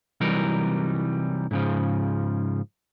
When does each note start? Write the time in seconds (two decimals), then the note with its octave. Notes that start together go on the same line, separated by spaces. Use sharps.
0.21 C2 E3 F#3 G3 D#4 A#4
1.51 G#2 C#3 F3